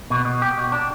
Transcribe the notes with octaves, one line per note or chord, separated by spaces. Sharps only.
B2
B2
G4
B2
D4